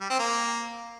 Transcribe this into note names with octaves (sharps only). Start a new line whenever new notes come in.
G3
C4
A#3